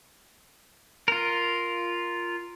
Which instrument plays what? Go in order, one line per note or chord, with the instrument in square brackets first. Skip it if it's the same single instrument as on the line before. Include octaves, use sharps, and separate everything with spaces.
[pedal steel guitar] F4 A#4